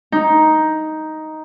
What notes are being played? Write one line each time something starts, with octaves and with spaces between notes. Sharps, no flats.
D#4